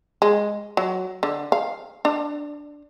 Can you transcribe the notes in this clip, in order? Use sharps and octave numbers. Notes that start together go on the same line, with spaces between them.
G#3
F#3
D3
F5
D4